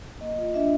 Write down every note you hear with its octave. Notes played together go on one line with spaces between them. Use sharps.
A#3 D#5
F4
D4 E5